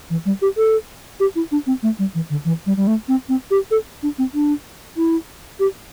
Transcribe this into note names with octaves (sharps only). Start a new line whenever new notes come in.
E3
G3
G4
A4
G4
E4
D4
C4
A3
G3
E3
D3
E3
G3
G3
A3
C4
C4
G4
A4
D4
C4
D4
E4
G4